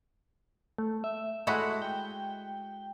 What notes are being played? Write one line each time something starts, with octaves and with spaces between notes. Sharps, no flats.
A3
E5
G#3 A3 E4 F#4
G5